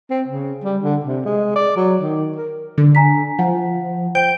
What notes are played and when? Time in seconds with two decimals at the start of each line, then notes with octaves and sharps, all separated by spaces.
0.10 C4
0.28 C#3
0.64 G3
0.83 D3
1.04 C3
1.25 G#3
1.56 D5
1.76 F#3
2.01 D#3
2.36 A#4
2.78 D3
2.95 G#5 A#5 B6
3.39 F3 F#5
4.15 C5 G5 G6 D7